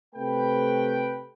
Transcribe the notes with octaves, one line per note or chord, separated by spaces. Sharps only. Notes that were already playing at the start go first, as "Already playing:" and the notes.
C3 A3 B4 G5